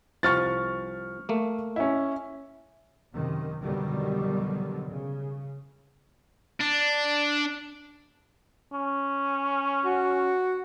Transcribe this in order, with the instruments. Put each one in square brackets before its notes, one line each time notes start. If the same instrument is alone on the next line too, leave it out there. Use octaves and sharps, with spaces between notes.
[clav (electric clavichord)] C2 F3 F#5 [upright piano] C#6 F6 A6
[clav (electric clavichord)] A3 A#3
[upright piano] C#4 E4
[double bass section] F#2 C3 D#3
F2 B2 D3 D#3 F#3 G3
C#3
[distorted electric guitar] D4
[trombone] C#4
[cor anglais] F#4